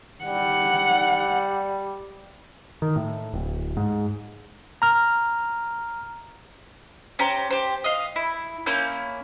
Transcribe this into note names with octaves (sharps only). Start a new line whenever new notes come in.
G3 F#5
D#3
A2
D1
G#2
A#5 F6
C#4 G4 C5 A#5
G4 C5
D#5 F5
E4
A#3 C#4 E4 G6